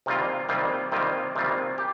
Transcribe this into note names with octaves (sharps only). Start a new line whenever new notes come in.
C3 D#3 G3 A#3 F4
C3 D#3 G3 A#3 F4
C3 D#3 G3 A#3 F4
C3 D#3 G3 A#3 F4
G4